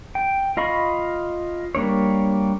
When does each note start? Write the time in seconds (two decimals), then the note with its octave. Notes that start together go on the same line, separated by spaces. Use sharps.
0.15 G5
0.57 F4 D#5 F5 B5 C#6
1.75 G3 A#3 D4 C#5